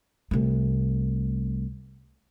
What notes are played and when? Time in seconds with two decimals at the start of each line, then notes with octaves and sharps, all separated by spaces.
0.31 C2 A3